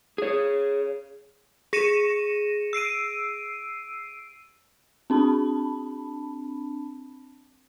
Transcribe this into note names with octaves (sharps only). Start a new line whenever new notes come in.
G#4 C#5
G#4 A#6 C#7 D#7 E7
E6 C7 D7 D#7
C4 D4 A5 B5